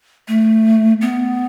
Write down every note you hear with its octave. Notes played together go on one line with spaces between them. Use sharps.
A3
B3